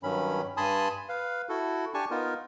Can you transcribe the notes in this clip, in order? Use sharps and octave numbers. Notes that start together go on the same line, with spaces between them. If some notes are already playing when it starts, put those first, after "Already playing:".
G2 D#3 F#3 C#4 B5
G2 G#5 A5 B5 C6 D#6
B4 F5
E4 F#4 A4
D4 G4 G#5 A5 C#6
B3 D#4 F4 A#4